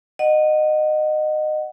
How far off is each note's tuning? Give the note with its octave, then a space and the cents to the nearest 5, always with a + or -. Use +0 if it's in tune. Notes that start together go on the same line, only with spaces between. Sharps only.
D#5 -20 F#5 +0